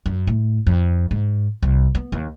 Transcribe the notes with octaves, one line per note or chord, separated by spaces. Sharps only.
F#2
A2
F2
G#2
C2
B3
D#2